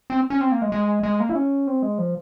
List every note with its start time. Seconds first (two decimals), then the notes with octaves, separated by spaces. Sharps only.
0.10 C4
0.30 C#4
0.41 C4
0.52 A#3
0.62 G#3
0.72 G#3
1.03 G#3
1.20 A#3
1.29 E4
1.35 C#4
1.67 C4
1.83 G#3
1.98 F3